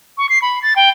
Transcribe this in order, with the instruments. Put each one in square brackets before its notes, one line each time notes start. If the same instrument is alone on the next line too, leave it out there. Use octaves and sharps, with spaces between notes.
[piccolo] C#6
C7
B5
A6
G5